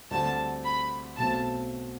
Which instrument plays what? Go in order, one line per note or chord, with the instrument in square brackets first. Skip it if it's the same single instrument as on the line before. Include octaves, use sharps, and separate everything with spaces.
[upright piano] D2 D3 G3 C4 [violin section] A5
[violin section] B5
[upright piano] B1 B2 A3 C4 [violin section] A5